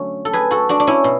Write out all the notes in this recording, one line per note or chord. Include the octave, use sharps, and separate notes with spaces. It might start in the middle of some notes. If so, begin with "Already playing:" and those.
Already playing: D3 F#3 A3 C#4 C#5
A4
G#4 B4
F#4 A4
D4 F#4
D4
C#4 E4
B2